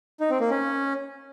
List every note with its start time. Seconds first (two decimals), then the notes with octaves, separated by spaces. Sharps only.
0.20 D#4
0.30 C4
0.40 A#3
0.50 C#4